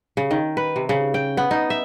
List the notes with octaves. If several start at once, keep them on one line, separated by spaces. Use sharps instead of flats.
C#3
D#3
B4
C3
C#3
G5
B3
D#4
E5